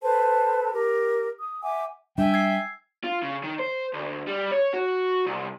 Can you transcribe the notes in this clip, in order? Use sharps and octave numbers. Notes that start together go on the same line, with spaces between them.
A4 B4 C5 A5
G4 A#4
D#6
E5 F#5 G#5 D6
G3 D4 E5 G5 G#5
E6 G#6 C7
F4
C#3
D#3
C5
D2
G3
C#5
F#4
C2